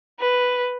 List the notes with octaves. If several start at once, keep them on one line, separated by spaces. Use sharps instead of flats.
B4